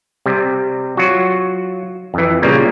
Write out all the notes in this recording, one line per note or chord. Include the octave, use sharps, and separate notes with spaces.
C3 G3
F#3 F4 F#4
F2 E3
A#2 C#3 G3 A#3